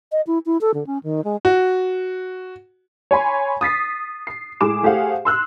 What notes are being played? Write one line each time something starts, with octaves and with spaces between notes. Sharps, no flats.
D#5
E4
E4
A4
D3
C#4
D#3
G#3
F#4
C#5 G#5 B5 C6
D#6 A6 B6 C7
C7
A2 G#3 G#4 D6 E7
A3 G4 G#4 C5 F5 F#5
C6 E6 F#6